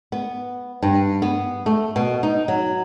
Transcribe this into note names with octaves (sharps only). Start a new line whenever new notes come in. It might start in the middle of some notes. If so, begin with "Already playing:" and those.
B3
G2
B3
A3
B2
D#4
F#3